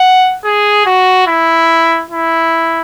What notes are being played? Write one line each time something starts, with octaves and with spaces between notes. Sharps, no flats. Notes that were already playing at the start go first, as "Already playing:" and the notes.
Already playing: F#5
G#4
F#4
E4
E4